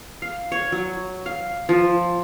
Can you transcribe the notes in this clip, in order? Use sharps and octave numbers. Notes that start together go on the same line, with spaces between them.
F5
C#5
F#3
F5
F3